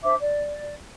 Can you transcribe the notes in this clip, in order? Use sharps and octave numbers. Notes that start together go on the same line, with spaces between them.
D4 C5 E5 D6
D5